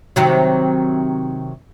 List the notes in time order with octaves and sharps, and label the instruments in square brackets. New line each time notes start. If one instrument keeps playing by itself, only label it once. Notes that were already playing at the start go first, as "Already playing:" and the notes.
[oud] C3 D#3 F#3